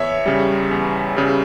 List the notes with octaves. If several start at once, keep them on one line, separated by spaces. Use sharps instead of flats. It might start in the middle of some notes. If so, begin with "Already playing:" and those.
Already playing: E2 C#5 E5
C#3 G3
E2
C#3 G3